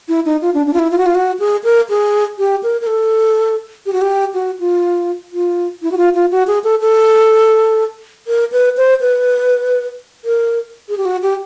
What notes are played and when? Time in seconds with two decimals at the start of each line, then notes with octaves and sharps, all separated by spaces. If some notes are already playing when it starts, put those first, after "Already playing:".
0.09 E4
0.25 D#4
0.42 F4
0.54 D4
0.67 D4
0.73 F4
0.79 E4
0.91 F4
0.98 F#4
1.06 F4
1.15 F#4
1.39 G#4
1.64 A#4
1.90 G#4
2.39 G4
2.63 A#4
2.81 A#4
2.87 A4
3.86 G4
3.93 F#4
4.01 G4
4.34 F#4
4.60 F4
5.33 F4
5.82 E4
5.92 F#4
5.98 F4
6.14 F4
6.32 F#4
6.47 G#4
6.64 A4
6.81 A4
8.28 A#4
8.52 B4
8.77 C5
9.01 B4
10.25 A#4
10.89 G#4
10.97 G4
11.05 F#4
11.22 G4